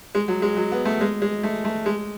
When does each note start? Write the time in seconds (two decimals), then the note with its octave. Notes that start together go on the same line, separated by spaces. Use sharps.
0.15 G#3
0.28 F#3
0.42 G#3
0.57 F#3
0.72 B3
0.85 A3
1.01 G#3
1.22 G#3
1.43 A3
1.65 A3
1.86 G#3